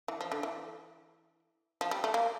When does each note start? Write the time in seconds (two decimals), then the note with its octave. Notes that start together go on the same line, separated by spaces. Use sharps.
0.08 E3
0.21 F3
0.32 D3
0.43 E3
1.81 F3
1.91 G3
2.04 A3
2.14 A#3